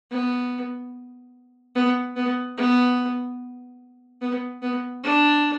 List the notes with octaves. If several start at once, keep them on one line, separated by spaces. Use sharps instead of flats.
B3
B3
B3
B3
B3
B3
D4